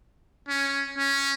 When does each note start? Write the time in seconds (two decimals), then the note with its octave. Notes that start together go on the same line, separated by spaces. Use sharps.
0.49 C#4
0.98 C#4